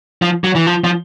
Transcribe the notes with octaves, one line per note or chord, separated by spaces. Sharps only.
F3
F#3
E3
F3
F3